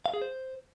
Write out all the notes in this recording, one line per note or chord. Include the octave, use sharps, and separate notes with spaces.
F5
G#4
C5